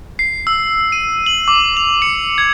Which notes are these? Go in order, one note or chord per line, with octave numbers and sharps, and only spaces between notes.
C7
E6
D#7
F#7
D6
F7
C#7
G#6